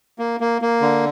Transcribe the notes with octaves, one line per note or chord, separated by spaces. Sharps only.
A#3
A#3
A#3
D3